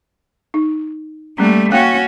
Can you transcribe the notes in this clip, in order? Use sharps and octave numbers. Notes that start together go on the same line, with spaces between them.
D#4
G3 A3 A#3 C#4
A#3 C#4 F#4 F5 G5